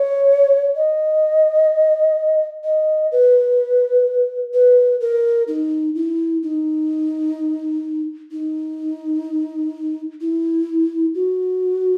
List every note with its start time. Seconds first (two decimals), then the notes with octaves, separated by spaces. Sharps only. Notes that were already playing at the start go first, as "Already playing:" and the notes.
Already playing: C#5
0.76 D#5
2.64 D#5
3.12 B4
4.54 B4
5.01 A#4
5.48 D#4
5.95 E4
6.43 D#4
8.31 D#4
10.21 E4
11.15 F#4